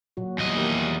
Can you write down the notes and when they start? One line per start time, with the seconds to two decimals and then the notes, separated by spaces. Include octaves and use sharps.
0.17 A#2 F#3 F#4
0.38 E2 A#2 F#3 G3 D#5
0.55 D#3 G4 A#4